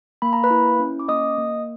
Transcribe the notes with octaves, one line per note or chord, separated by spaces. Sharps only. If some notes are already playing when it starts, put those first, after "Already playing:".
A#3 B5
A#5
B4 B5
E4
C#4
D6
A#3 D#5 D#6
A#3